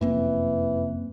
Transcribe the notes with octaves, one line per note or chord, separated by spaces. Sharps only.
F1 F#2 E3 A#3 C4